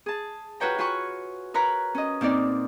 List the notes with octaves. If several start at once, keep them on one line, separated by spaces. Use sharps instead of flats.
G#4 A5
F4 F#4 B4 C#5 G5 A#5
F4 F#4 G#5 B5 C#6
A#4 B4 C#5 A#5 B5
C#4 D#5
A#2 C4 D#4 D5